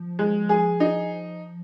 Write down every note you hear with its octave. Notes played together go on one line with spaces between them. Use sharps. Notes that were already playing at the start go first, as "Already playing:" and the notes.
Already playing: F3
G#3
G#4
D#4